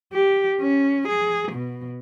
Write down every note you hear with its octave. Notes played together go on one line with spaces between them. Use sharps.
G4
C#4
G#4
B2